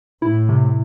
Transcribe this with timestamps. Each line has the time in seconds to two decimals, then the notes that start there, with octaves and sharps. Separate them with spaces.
0.22 A2 E4
0.49 C3